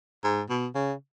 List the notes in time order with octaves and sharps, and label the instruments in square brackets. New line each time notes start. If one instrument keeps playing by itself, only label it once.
[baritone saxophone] G#2
B2
C#3